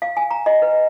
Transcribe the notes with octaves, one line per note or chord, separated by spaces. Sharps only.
F5
G#5
A#5
D#5
B4